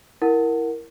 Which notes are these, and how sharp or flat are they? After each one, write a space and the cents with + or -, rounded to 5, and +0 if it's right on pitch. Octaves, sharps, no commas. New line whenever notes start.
E4 +0 A#4 +0 F#5 +0